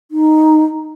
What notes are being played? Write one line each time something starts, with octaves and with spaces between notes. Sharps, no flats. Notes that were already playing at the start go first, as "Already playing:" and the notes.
D#4